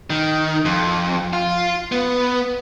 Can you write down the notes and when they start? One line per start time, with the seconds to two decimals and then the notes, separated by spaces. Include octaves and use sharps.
0.10 D#3
0.65 F2
1.33 F4
1.92 B3